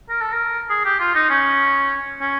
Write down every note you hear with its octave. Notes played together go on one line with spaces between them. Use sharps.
A#4
A4
A#4
G#4
G4
F4
D#4
C#4
C#4